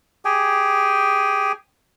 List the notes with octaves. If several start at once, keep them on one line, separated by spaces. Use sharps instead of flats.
G4 G#4 G5 G#5